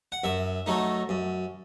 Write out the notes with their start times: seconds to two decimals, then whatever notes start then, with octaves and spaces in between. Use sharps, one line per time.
0.12 F#5
0.24 F#2 E5
0.66 F#3 A3 D#4
1.09 F#2